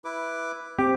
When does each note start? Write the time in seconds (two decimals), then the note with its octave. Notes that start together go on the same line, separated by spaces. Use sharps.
0.05 E4 B4 D6
0.79 C4 G4 D6